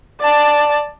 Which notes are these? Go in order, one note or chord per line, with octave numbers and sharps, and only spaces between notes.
D5 A5